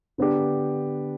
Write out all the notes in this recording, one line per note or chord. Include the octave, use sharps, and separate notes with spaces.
D3 B3 D4 G4